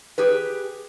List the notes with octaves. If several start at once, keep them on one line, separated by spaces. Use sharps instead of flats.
G4 G#4 B4